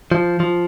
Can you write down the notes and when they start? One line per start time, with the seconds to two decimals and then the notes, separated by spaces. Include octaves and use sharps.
0.12 F3
0.40 F3